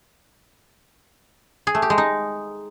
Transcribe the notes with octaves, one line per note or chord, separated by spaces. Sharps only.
G#4
A3
G4
G#3
D#4